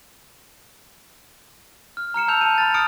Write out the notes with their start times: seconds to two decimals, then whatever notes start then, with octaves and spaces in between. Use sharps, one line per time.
1.97 F6
2.14 A#5 F6 C#7 E7
2.28 A5 E6 G6 C#7 F7
2.41 A5 G6 D#7
2.58 B5 F6 A6
2.74 D#6 F6 C#7 D7